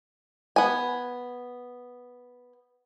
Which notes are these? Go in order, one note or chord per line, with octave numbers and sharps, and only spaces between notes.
B3 G#5